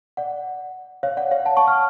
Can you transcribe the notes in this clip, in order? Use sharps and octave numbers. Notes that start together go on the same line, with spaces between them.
D5 F#5
C#5 F5
D5 F#5
C#5 F5
F#5 A5
A5 C#6
C#6 F6